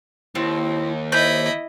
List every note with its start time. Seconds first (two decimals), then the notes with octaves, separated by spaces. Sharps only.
0.35 D#2 C4 E4
1.12 E4 C5 D#5 G6